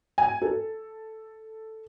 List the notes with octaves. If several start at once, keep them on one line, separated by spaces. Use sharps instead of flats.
G#5
A4